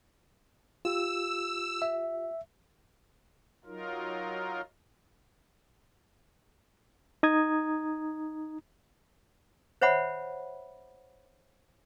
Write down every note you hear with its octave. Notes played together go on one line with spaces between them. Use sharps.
F4 G4 E6
E5
F#3 D#4 F4 A#4
D#4 A#5 D#6 G#6
C5 C#5 E5 F#5 B5